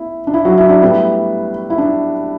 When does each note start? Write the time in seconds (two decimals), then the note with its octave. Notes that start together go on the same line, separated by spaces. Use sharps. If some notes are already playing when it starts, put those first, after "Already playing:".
Already playing: B3 E4
0.27 D4
0.34 E4
0.45 F#3 F#4
0.58 E4 E5
0.69 D4 D5
0.81 A2 G3 B3 E4
1.70 E4
1.78 D4